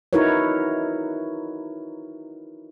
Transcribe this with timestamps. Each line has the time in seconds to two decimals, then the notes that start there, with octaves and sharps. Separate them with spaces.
0.13 D#4 E4 F#4 A#4 B4 C#5